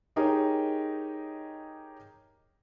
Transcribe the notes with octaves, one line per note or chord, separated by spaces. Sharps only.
D#4 G4 G#4 A#4 C#5 D#5